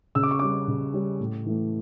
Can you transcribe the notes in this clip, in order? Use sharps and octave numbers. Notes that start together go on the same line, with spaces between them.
C#3 E6
D6
C#6
G3 C#4 D6
C#3
G3 C#4
A2
E3 A3